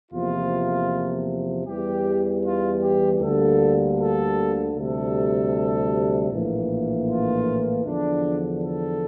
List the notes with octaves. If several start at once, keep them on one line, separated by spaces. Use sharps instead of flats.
E2 C3 F3 A#3 F4
E2 E3 G3 G4
F4
G4
D2 D3 G3 A#3 A4
A4
D2 C3 G3 A4
A#1 A2 E3 A#3
F4
E2 D3 F3 D4
A4